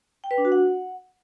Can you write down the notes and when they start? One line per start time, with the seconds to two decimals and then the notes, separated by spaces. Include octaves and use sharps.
0.24 G5
0.31 B4
0.38 D4
0.45 F#4
0.52 F#5